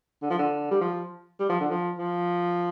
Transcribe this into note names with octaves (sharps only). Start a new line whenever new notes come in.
D3
F3
D3
G3
F3
G3
F3
D3
F3
F3